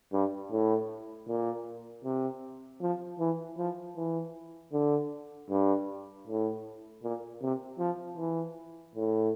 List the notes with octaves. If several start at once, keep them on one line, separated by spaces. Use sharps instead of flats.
G2
A2
A#2
C3
F3
E3
F3
E3
D3
G2
A2
A#2
C3
F3
E3
A2